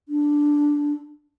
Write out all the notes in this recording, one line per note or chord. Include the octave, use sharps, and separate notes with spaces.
D4